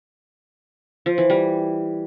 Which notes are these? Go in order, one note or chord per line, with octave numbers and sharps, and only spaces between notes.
F3
E3
G3